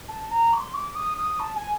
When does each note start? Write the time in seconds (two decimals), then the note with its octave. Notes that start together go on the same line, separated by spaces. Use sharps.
0.08 A5
0.31 A#5
0.53 D6
0.57 C6
0.74 D6
0.95 D#6
1.17 D#6
1.39 A5
1.56 G#5